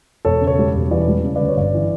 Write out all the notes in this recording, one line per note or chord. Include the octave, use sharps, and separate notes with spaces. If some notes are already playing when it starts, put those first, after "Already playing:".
E1 A4 C#5
C#3
A4 C#5
G3
E1
E3 B4 D5
G3
C#3
B4 D5
D2
C#5
G1 B4 D5
E3